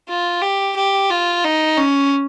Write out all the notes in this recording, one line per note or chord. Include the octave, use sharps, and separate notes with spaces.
F4
G4
G4
F4
D#4
C#4